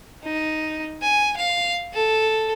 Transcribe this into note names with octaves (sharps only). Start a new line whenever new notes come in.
D#4
G#5
F5
A4